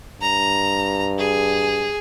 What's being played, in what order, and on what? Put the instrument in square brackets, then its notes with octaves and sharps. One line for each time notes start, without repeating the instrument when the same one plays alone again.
[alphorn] G2 [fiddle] A#5
[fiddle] G#4